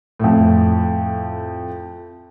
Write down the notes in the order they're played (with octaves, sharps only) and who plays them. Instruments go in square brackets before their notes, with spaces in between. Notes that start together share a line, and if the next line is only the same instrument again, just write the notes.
[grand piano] F2 A2